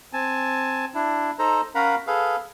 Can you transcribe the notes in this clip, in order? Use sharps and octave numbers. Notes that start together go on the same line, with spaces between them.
C4 G#5 A5
D4 E4
D#4 A4 C5 A#5
C#4 A#4 F5 F#5 A#5 B5
G#4 A4 B4 F5